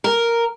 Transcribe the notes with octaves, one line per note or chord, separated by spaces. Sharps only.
A#4